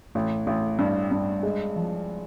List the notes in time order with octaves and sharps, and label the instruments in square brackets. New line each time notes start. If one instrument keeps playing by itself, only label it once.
[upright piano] A1
A1
G2
G2
G#3
F3